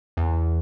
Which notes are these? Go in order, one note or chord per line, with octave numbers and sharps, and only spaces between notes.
E2